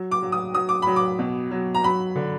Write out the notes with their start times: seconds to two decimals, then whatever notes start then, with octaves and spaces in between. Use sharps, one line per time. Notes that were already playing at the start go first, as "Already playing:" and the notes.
Already playing: F#3
0.11 D6
0.22 F#3
0.32 D#6
0.54 F#3 D#6
0.69 D6
0.82 F#3 B5
0.96 D6
1.19 B2
1.51 F#3
1.75 A#5
1.83 F#3 B5
2.16 D3